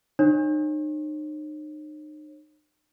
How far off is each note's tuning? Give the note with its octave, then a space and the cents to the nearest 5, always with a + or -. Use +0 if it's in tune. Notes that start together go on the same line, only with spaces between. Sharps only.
D#4 -40 C#5 -40